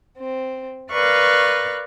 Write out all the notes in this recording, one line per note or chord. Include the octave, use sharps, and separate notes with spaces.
C4
A#4 B4 D5 F5 C#6 F#6